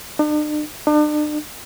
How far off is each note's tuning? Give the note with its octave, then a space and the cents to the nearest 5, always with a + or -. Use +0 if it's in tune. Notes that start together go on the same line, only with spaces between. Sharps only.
D4 +45
D4 +40